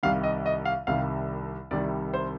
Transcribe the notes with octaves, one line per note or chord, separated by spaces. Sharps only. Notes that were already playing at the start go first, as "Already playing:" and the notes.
C2 C3 D#3 G3 F5
D#5
D#5
F5
C2 C3 D#3 G3 F5
C2 C3 D#3 G3 D5
C5